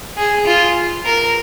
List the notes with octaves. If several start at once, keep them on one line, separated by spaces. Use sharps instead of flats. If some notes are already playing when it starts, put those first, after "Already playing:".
G#4
F4
A#4